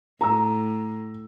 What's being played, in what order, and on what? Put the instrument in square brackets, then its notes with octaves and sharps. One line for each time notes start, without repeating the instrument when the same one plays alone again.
[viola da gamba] A2 [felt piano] A#5 E6